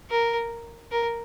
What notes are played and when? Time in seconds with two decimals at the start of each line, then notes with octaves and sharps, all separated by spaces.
0.10 A#4
0.91 A#4